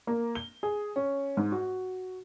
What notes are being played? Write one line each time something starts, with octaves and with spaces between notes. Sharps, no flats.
A#3
G7
G#4
C#4
G#2
F#4